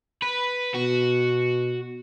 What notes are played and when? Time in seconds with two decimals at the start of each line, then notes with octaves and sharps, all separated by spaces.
0.22 B4
0.75 B2 F#4